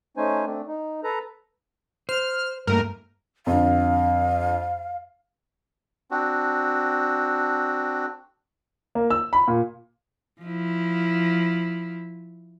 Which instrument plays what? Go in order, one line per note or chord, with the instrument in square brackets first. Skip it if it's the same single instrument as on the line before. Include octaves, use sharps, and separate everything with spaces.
[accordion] A3 C#4 D#4 C5 G#5
A3 C4 D4
D#4
A4 B4 A#5
[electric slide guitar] C5 [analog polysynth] F6
[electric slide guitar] G2 A3 A#3 [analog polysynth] A#4
[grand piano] F2 D3 [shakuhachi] F5
[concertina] C4 D4 F#4
[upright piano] A#3
E6
B5
A#2
[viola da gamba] F3 E4